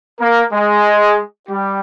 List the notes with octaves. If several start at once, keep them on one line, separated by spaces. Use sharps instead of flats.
A#3 A#4
G#3 G#4
G3 G4